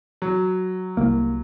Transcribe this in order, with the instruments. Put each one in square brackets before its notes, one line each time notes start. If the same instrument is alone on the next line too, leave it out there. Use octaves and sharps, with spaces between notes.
[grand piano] F#3
[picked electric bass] C2 A#3